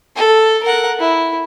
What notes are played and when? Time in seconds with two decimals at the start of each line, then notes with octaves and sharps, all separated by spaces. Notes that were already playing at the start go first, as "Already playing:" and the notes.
0.16 A4
0.64 A#4 F#5
1.00 E4